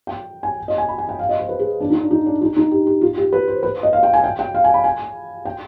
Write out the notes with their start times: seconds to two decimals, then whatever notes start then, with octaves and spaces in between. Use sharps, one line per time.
0.07 G5
0.43 G#5
0.68 D#5
0.78 G#5
0.88 B5
0.98 G#5
1.09 G5
1.19 F5
1.29 D#5
1.40 C5
1.49 B4
1.59 G#4
1.80 D4
1.90 D#4
2.01 D4
2.11 D#4
2.26 D4
2.41 D#4
2.56 D#4
2.71 G4
2.87 G4
3.01 F4
3.17 G4
3.33 B4
3.48 C5
3.63 B4
3.83 D#5
3.93 F5
4.03 G5
4.13 G#5
4.24 G5
4.39 G5
4.55 F5
4.64 G#5
4.74 B5
4.84 G#5
5.45 G5